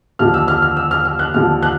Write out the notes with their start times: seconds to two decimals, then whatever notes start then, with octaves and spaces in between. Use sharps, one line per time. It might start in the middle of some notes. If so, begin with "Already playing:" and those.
0.19 D#2 D3 F3 F6
0.34 E6
0.48 F6
0.62 F6
0.77 E6
0.91 F6
1.05 F6
1.19 F#6
1.34 D#2 D3 F3 F6
1.63 F#6